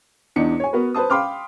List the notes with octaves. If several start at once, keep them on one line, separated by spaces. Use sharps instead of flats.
E2 D4 D#4 C#7
C#5 G#5
B3 F#4 A#4 B4
B4 C5 A5 D#6
F5 G5 B5 C6 D6 F6